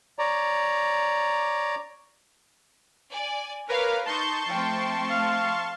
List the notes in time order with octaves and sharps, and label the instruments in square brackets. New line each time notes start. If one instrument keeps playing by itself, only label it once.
[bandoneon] C#5 D5 A#5
[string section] D5 G#5
[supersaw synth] A#4 B4 [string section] C#5 F5 D6
[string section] D#4 G6 [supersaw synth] A5 C6 C#6
[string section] F3 A3 C4 [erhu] G5
[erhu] F5